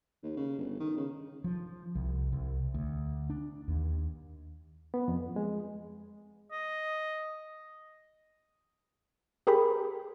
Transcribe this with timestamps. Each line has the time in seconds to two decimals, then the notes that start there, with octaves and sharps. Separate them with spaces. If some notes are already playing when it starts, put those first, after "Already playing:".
0.23 D#2
0.37 C#3
0.58 G1
0.80 D#3
0.97 C#3
1.44 F3
1.95 C2
2.32 C2
2.74 D2
3.30 D4
3.68 D#2
4.94 B3
5.08 F2
5.36 G#3
6.52 D#5
9.47 G4 G#4 A#4 G5 B5